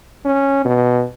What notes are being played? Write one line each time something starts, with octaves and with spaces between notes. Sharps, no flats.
C#4
B2